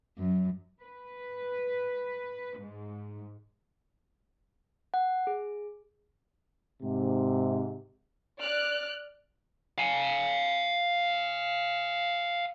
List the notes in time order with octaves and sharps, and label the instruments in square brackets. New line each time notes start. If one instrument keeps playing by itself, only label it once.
[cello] F#2
[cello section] B4
G#2
[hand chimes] F#5
G#4
[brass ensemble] G#2 C3
[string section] D5 F6 F#6
[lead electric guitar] F5 G#5